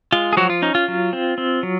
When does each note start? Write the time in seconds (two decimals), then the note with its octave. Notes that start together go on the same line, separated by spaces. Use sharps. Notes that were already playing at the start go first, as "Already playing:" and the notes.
0.12 G#3 F4
0.33 G#4
0.37 F3 F#3 F#4
0.50 F4
0.62 C#4 D#4
0.75 F4
0.88 F#3
1.13 C4
1.38 C4
1.63 F#3